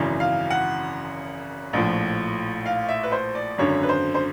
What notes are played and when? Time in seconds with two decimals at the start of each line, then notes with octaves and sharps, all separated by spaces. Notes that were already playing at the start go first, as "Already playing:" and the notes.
Already playing: G#1 F#2 C#3 E3
0.20 F5
0.50 F#5
1.73 A#1 A2 F3
2.66 F5
2.89 E5
3.03 B4
3.12 C5
3.35 D5
3.58 G#1 F#2 D3 C#5
3.83 B4
3.89 C5
4.14 C5